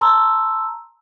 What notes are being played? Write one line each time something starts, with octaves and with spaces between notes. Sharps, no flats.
A5 A#5 C6 E6